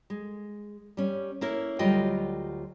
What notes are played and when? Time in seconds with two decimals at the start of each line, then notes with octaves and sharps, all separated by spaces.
0.10 G#3
0.97 G3 C#4
1.41 A#3 C#4 E4 A#4
1.79 D2 F#3 G3 F4 D#5 G5